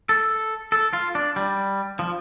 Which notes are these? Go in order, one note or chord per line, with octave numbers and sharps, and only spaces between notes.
A4
A4
F4
D4
G3
F3